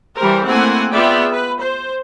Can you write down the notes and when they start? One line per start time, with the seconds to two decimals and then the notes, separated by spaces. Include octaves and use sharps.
0.18 E3 G3 G4 A#4 C5
0.48 A3 A#3 C4 E4 F#5 G#5
0.92 B3 F4 G#4 D5 E5 G5
1.33 B4
1.63 C5